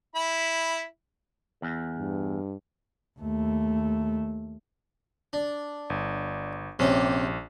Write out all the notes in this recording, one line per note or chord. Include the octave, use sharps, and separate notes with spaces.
E4 B5
E2
G2
D#2 A3
D4
G1
A#1 C3 C#4 G4